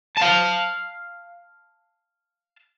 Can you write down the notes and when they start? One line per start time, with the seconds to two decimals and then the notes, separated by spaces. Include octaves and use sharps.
0.18 F5 A5